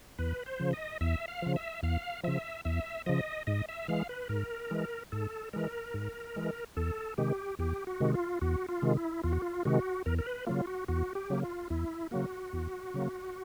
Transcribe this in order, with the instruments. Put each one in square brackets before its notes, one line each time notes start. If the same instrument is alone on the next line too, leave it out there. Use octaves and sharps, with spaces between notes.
[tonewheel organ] E2 B4
C5
C#3 F3
D#5
E2 E5
F5
C#3 F3
E5
E2 F5
C#3 F3 E5
E2 E5
C#3 F3 D#5
G#2 D#5
E5
E3 G#3 F5
B4
G#2 A#4
E3 G#3
G#2 A4
E3 G#3 A#4
G#2
E3 G#3
E2 A4
C3 D#3 G#3 G4
E2 G4
F#4
C3 D#3 G#3
F4
E2 F#4
F4
C3 D#3 G#3
E4
E2 F4
F#4
F4
C3 D#3 G#3 F#4
E2 A#4
A#4
B4
C#3 F#3 A#3 F4
F#4
E2 F#4
G4
C#3 F#3 A#3
F4
E2 E4
C#3 F#3 A#3 F#4
E2
C#3 F#3 A#3